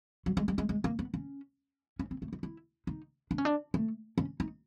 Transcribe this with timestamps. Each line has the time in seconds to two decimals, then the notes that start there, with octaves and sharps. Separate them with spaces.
0.26 F#3
0.37 G#3
0.48 G3
0.58 G#3
0.69 G#3
0.84 A#3
0.99 B3
1.14 C#4
1.99 C#4
2.11 C4
2.22 A3
2.33 D#4
2.43 E4
2.87 D#4
3.31 D4
3.38 C#4
3.45 D4
3.74 A3
4.18 C#4
4.40 D#4